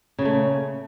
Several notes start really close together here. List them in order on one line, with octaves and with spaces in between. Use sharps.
C#3 A#2 A3